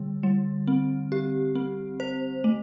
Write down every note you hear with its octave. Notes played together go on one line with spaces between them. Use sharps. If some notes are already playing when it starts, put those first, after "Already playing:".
Already playing: D3 G3
G3
C4
G4
C4
C5
A3